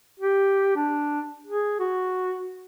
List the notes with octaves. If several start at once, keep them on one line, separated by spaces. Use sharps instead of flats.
G4
D4
G#4
F#4